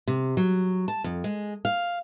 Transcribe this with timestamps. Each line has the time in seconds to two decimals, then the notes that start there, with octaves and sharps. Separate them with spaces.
0.08 C3
0.37 F#3
0.88 A5
1.04 F2
1.24 G#3
1.65 F5